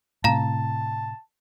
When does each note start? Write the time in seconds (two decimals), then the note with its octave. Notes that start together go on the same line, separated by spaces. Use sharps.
0.24 A2 C3 F5 A5 A#5